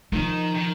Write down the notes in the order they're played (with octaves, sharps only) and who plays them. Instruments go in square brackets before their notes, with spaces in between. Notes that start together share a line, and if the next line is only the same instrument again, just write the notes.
[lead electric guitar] D#3 [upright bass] F3
[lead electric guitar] D#3